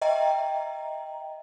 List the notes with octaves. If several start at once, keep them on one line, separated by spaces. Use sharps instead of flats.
D#5 E5 G5 A#5